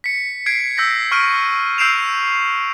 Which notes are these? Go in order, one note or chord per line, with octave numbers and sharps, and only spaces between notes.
B6 C#7
G#6 B6 C7 D7
E6 G6 A#6 B6
C#6 F6 D7 D#7
E6 G6 C7 D7 E7 F7